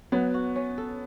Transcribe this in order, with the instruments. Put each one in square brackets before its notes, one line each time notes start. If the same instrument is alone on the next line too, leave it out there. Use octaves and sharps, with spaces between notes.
[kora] F#3 [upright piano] B3
[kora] F#4
C#4
A4